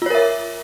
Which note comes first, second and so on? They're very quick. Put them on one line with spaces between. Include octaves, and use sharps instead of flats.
F4 C#5 A#4 E5